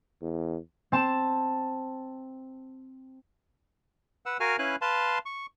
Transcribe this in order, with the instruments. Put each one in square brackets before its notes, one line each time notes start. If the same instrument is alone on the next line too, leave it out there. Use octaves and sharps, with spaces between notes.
[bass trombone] E2
[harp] C4 A5 E7
[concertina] B4 F#5 E6
F#4 A#4 F5 G#5 F6
C#4 E4 B4 F5 G#5 F#6
B4 F5 A5 C6
C#6